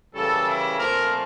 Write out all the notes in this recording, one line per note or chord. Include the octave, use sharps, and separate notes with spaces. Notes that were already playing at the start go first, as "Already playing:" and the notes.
C#3 E3 G3 A#3 A4
E4
A#2 F3 A3 C4 A#4